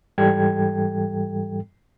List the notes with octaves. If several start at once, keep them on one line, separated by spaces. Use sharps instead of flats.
G#2 E3 G3 A4 G5 G#6